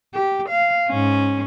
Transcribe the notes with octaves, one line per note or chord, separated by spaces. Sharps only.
G4
F5
G#2 C#4